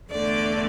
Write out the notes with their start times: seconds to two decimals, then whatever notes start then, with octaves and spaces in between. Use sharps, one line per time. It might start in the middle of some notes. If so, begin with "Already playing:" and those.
0.10 E2 D3 A3 D5